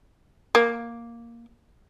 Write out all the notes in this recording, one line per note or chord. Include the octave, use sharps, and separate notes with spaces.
A#3